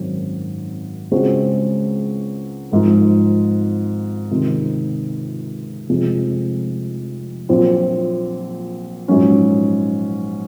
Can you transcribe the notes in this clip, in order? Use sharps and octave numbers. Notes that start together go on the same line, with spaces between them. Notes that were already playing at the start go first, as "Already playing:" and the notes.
Already playing: G#1 F#2 D#3 F#3 C4
C#2 C#3 G#3 C4 F#4
G#1 G#2 F3
C#2 C3 D#3
F1 F2 C3 F3 G#3
A#1 A#2 F#3 C4
A#1 G#2 F#3 C#4